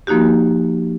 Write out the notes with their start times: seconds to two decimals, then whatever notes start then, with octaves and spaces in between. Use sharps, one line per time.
0.07 F3 A#3 D#4 F#4 G4